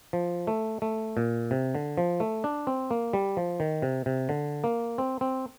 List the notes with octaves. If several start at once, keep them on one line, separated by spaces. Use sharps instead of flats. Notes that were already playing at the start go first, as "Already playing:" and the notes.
F3
A3
A3
A#2
C3
D3
F3
A3
D4
C4
A#3
G3
F3
D#3
C3
C3
D3
A#3
C4
C4